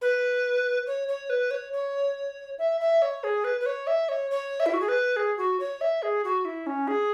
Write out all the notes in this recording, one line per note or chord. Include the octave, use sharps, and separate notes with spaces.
B4
C#5
C#5
B4
C#5
C#5
E5
E5
C#5
G#4
B4
B4
C#5
E5
C#5
C#5
E5
E4
F#4
G#4
B4
G#4
F#4
C#5
E5
G#4
F#4
E4
C#4
G#4